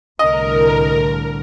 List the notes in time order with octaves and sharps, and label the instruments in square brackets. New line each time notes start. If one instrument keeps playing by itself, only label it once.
[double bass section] C2 A2 D3 [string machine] A#4 [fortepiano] D#5